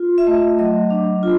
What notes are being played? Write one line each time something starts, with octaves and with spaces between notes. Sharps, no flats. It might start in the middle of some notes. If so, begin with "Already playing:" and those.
Already playing: F4
E5
A3 D#5
F#3 D#5
D4
F4